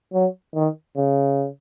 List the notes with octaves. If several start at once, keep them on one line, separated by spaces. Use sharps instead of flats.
F#3
D#3
C#3